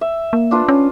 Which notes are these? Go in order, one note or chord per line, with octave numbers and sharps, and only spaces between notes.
E5
A#3
D4 F4 B4
C#4